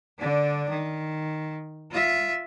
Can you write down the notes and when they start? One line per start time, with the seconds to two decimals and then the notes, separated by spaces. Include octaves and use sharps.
0.19 D3 D4
0.69 D#3
1.91 F4 E5